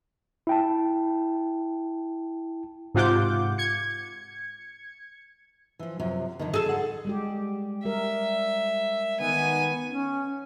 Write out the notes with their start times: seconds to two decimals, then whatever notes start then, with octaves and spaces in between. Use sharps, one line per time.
0.47 E4 G5 A5
2.95 G#2 C3 F4 F#5 D6 G6
3.58 G#6 C#7
5.79 E3 F3
6.00 F#2 C3 F3
6.39 F2 D3 D#3
6.54 G#4 A4
6.66 D3 F#5
7.05 G3 G#3 G4
7.85 G3 A#4 E5
9.20 D#3 B3 G#5
9.88 C#4